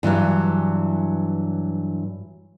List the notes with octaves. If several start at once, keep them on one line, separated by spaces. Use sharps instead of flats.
G2 E3 F#3 G3